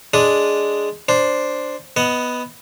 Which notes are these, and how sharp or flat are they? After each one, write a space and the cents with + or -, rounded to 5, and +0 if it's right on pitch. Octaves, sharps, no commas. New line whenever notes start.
G#3 +0 D4 -5 D#6 +0
D4 +0 C5 +0
B3 +0 D#5 +15 F#5 +0